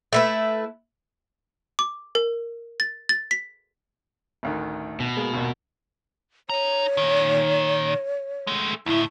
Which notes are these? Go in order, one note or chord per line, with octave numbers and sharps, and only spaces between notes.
A3 E4 B4
D6
A#4
A6
A6
B6
A1 D2 D#3
B2
G#3 A#3
G#1 D#2 A#2
D#4 C#5 A#5
A#2 D#3
G#3 A3
D2 A2 E4